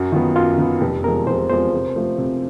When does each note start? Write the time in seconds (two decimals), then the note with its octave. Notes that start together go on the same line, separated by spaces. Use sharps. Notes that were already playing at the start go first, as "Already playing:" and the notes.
Already playing: F#2 F#4
0.12 D#3 F#3 B3 F4
0.35 F#2 F4
0.58 D#3 F#3 B3
0.81 F1 G4
1.04 E2 C3 F3 G#3 A#4
1.27 F1 C5
1.49 E2 C3 F3 G#3 C5
1.73 C3
1.96 F3 A3
2.18 C3